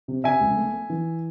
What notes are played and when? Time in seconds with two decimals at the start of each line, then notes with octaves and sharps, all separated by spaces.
0.08 C3
0.24 C3 E5 G#5
0.41 C#2
0.57 A3
0.74 A3
0.90 E3